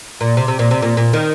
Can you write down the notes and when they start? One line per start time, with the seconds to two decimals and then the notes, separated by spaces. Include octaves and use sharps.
0.21 A#2
0.37 C3
0.48 C3
0.59 A#2
0.71 C3
0.82 A#2
0.97 A#2
1.13 D#3